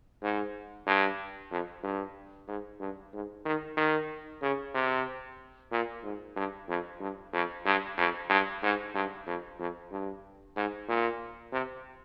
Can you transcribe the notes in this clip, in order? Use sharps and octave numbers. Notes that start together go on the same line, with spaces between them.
G#2
G2
F2
G2
G#2
G2
G#2
D#3
D#3
C#3
C3
A#2
G#2
G2
F2
G2
F2
G2
F2
G2
G#2
G2
F2
F2
G2
G#2
A#2
C3